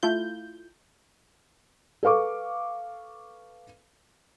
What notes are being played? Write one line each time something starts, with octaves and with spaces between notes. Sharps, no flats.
A3 E4 F4 G6
A4 B4 F5 C#6 D6